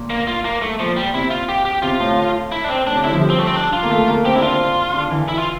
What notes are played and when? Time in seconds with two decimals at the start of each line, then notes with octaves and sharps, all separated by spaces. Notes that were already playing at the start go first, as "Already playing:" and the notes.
Already playing: A#2
0.10 A#3
0.27 F4
0.45 A#3
0.62 A3
0.79 A#2 F3
0.96 G3
1.14 C3 E4
1.30 F4
1.49 G4
1.65 G4
1.82 C3 F4
2.00 A2
2.52 E4
2.64 D4
2.69 C4
2.86 A2 D4
2.95 C3
3.04 D3 E4
3.12 F3
3.21 G3
3.30 C4
3.39 A3
3.47 C4
3.56 D4
3.73 F4
3.83 A#3
3.90 A3
4.08 A#3
4.25 C4 G4
4.35 D4 E4
4.42 C4 F4
4.94 D4
5.11 E3
5.28 E4
5.38 F4